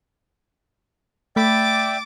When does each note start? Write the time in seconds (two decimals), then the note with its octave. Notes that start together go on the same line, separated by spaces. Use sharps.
1.36 A3 D5 E5 G5 B5 D6 A6 B6